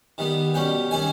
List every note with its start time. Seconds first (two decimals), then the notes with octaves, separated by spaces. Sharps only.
0.18 D#3 G3 B3
0.54 B2 G3 C#4 G5
0.91 D#3 G3 C#4 G#5